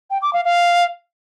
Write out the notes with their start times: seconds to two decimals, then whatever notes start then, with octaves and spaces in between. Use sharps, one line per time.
0.10 G5
0.22 D6
0.33 F5
0.45 F5